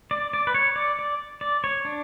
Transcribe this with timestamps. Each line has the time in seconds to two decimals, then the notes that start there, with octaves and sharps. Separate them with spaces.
0.11 D5
0.33 D5
0.47 B4
0.54 C#5
0.76 D5
0.99 D5
1.41 D5
1.64 C#5
1.85 D4